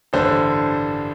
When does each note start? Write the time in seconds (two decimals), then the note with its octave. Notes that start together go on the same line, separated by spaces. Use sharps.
0.13 A1 G2 D3 C5